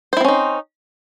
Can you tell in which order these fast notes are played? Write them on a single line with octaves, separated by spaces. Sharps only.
C5 E4 C4 C#4 D#4